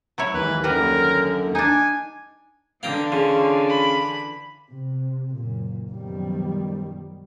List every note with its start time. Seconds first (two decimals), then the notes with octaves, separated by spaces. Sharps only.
0.18 F#3 E4 C#5
0.34 D#2 G#2 E3 B4
0.64 F#2 D3 G3 A#4 B4
1.55 D4 D#4 G#5
2.83 D3 E3 F5 G5 A#5
3.12 C#3 C#4 F4
3.69 B5
4.72 C3
5.34 F#1 A#2
5.91 F#2 B2 D#3 F3 G3